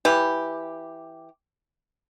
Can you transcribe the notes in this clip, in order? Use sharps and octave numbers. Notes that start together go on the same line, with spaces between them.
E3 G4